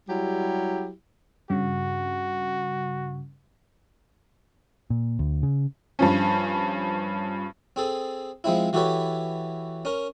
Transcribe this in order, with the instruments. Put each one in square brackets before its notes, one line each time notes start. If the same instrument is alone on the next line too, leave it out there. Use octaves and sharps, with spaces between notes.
[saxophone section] F#3 G3 E4 G4
[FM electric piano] G2 C#3 [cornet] F#4
[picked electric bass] A#2
D2
C#3
[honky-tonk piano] G2 F3 C#4
[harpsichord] C4 G#4 A4
F3 G#3 C4 E4
E3 F#4 G4 A4 B4 C#5
C#4 A#4